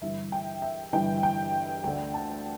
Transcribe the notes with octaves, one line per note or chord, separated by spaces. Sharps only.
G1 G2 E3 E5
G5
E5
G1 G2 E3 G5
G5
D2 D3 A3 D4 G5
A5